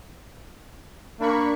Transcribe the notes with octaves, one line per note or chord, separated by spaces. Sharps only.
A#3 D4 B5 C#6